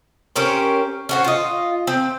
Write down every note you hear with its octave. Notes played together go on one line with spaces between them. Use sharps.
C#4 G4 A#4 C5
C#4 F#4 C5
F4 D#5
C4